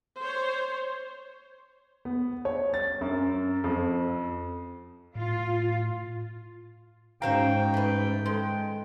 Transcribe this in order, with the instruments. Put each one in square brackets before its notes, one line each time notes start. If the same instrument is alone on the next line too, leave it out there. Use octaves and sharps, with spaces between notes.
[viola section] C5 C#5
[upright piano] B3
C#5
A6
F#2
F2
[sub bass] A2 [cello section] F4
[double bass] G#2 [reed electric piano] C#4 A#5 [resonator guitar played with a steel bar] F#4 C5 F5 [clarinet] G5
[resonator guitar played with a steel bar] A3 B4
[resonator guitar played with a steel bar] G#3 [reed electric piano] A4